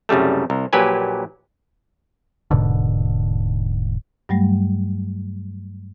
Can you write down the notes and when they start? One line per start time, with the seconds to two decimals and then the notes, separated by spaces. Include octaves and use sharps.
0.09 C2 F#2 C#3 G3 A3
0.50 C2
0.73 A#1 A#2 F#3 G4 B4 G#5
2.51 D#1 G#2 B2 D3
4.29 G2 F#3 G3 A3